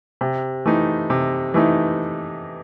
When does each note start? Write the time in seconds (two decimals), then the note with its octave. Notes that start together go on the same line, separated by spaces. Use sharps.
0.21 C3
0.66 E3 A3 D#4
1.10 C3
1.54 E3 A3 D#4